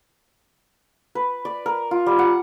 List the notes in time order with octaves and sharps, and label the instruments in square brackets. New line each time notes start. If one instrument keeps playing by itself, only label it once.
[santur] B4
D5
A#4
F4
G3
F#5